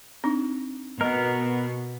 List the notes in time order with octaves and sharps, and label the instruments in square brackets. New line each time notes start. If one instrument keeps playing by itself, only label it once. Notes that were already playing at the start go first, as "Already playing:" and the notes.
[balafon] C4 D4 D#4
[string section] B2 [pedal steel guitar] B3 A#4 [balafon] D#5